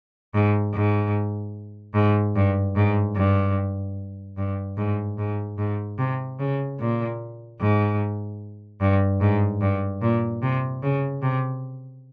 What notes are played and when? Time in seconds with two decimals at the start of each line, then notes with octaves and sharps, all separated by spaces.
0.34 G#2
0.74 G#2
1.94 G#2
2.36 G2
2.76 G#2
3.16 G2
4.38 G2
4.77 G#2
5.18 G#2
5.58 G#2
5.98 C3
6.39 C#3
6.80 A#2
7.60 G#2
8.81 G2
9.21 G#2
9.62 G2
10.02 A#2
10.42 C3
10.83 C#3
11.22 C3